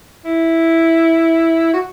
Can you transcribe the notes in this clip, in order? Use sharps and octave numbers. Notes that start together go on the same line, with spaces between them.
E4
F#4